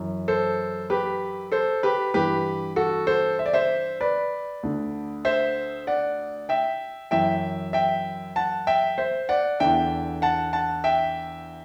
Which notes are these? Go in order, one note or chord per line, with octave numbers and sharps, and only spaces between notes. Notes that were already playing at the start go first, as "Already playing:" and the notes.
Already playing: F#2 E3
A4 C5
G4 B4
A4 C5
G4 B4
G2 E3 G4 B4
F#4 A4
A4 C5
E5
D5
C5 E5
B4 D5
D2 D3
C5 E5
D5 F#5
E5 G5
F#2 E3 E5 G5
E5 G5
F#5 A5
E5 G5
C5 E5
D5 F#5
E2 D3 E5 G5
F#5 A5
F#5 A5
E5 G5